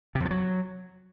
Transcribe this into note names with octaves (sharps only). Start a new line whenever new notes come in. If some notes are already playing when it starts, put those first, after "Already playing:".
C3
F2
F3
F#3